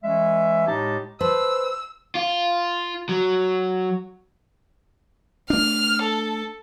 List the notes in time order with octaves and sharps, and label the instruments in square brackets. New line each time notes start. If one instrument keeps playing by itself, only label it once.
[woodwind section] E3 G#3 C#4 E5
A2 G#3 D#4 G4 A5 A#5
[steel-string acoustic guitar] B4 C5 A5 [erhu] E6
[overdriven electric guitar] F4
F#3
[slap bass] A3 D4 [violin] F6
[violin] A4